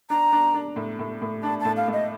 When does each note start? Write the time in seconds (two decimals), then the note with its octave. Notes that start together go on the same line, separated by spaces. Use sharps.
0.10 D4 A#5
0.33 D4
0.54 D4
0.76 A2
0.99 A2
1.22 A2
1.43 D4 A5
1.60 A2 A5
1.77 F5
1.88 A3
1.93 D#5